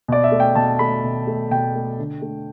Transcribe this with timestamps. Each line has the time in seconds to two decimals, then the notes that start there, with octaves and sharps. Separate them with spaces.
0.08 B2 D5
0.24 E5
0.32 A3
0.40 G5
0.55 B2 A5
0.79 A3 B5
1.04 B2
1.27 A3
1.51 B2 G5
1.75 A3
1.99 D3
2.22 A3